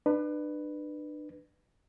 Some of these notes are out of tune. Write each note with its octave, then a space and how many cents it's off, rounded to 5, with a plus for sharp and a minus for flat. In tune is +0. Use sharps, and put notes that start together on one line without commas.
D4 +35 B4 +0